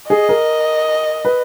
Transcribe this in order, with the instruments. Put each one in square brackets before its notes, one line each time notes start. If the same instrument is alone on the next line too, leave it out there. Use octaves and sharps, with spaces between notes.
[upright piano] G#4 [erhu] D#5
[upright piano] A#4
B4